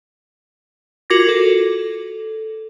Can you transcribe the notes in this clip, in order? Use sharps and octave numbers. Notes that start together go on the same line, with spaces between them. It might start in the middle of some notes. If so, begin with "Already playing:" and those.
F4 F#4 A#4 D6 G#6 A#6
A4